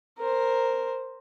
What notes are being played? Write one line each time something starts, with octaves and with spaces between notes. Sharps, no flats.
A#4 C5